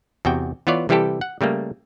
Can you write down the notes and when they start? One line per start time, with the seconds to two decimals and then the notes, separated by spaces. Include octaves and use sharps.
0.25 E2 C3 F#4 G5
0.67 E3 B3 F4 C#5 D5
0.89 C3 E3 G3 E4 G4 A4
1.21 F#5
1.41 C#3 G3 A3 A#3